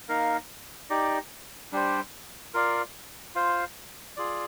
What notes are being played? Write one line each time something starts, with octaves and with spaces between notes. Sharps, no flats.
A#3 D#4 A#4 F5
D#4 G4 D5
G3 D4 G4 C5
F4 A#4 D5 F5
F4 C5 F5
F4 G#4 D5